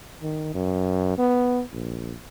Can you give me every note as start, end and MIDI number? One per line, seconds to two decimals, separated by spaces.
0.22 0.54 51
0.54 1.17 42
1.18 1.63 59
1.73 2.14 34